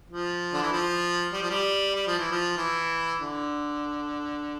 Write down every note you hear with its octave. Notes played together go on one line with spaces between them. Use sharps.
F3
D3
E3
F3
G3
F3
G3
G3
F3
E3
F3
E3
D3